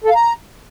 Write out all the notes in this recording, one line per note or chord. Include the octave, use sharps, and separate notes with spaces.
A4
F5
A#5